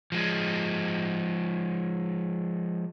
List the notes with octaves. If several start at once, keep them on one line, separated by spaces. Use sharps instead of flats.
F3 G#3